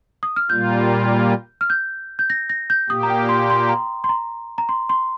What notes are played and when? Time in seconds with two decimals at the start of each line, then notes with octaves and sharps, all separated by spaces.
0.23 D#6
0.36 F6
0.50 A#2 G3 A#3 F4 G6
1.61 F6
1.70 G6
2.19 G6
2.30 A#6
2.50 A#6
2.70 G6
2.89 A#2 A#3 G4 D#6
3.03 A#5
3.10 G5
3.29 C6
3.50 C6
3.69 A#5
4.04 C6
4.09 A#5
4.58 A#5
4.69 C6
4.89 C6